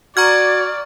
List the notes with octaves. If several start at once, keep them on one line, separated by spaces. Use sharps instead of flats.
F#4 D5 A#5 C#6 F6 G#6